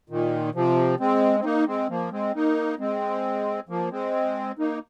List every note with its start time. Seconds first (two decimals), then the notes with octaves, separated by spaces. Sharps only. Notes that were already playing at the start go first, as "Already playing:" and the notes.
0.10 A#2 D#3
0.55 C3 F3
1.00 G#3 C4
1.40 C4
1.44 A#3 D#4
1.67 G#3 C4
1.89 F3 A#3
2.12 G#3 C4
2.35 A#3 D#4
2.79 G#3 C4
3.69 F3 A#3
3.91 G#3 C4
4.59 A#3 D#4